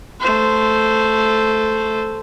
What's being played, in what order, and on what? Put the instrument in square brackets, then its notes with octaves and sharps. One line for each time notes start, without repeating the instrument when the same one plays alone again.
[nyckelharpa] A3 C5